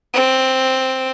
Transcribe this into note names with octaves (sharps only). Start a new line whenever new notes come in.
C4